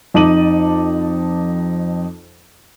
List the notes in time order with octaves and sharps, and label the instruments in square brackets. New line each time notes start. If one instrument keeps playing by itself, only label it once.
[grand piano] F2 D#4 A5 D6 D#7 F#7